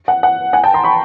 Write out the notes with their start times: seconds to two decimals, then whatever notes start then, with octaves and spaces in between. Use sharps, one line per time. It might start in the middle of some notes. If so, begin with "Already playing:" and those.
0.08 F#5
0.23 F#5
0.53 F#5 G#5
0.64 G5 A5
0.74 A#5 C6
0.84 B5 C#6